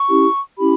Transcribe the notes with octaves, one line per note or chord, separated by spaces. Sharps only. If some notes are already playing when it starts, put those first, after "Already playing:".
Already playing: C#6
C#4 E4 G4
C#4 E4 G4 B5